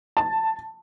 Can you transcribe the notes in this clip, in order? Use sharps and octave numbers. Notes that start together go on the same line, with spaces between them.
A5